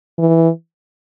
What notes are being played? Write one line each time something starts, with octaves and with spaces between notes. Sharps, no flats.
E3